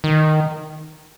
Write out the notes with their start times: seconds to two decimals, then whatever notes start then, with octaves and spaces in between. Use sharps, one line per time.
0.04 D#3